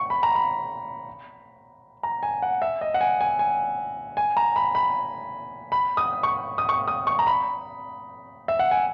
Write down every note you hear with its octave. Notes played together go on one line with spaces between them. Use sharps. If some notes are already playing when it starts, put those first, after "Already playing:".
Already playing: C#6
B5
A#5
B5
A#5
G#5
F#5
E5
D#5
F#5
G#5
G#5
G#5
G#5
A#5
B5
B5
B5
D#6
C#6
D#6
C#6
D#6
C#6
A#5
B5
E5
F#5
G#5